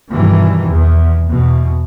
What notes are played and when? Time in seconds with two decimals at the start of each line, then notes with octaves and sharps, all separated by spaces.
0.11 G2 B2 D#3 E3
0.67 E2
1.28 E2 B2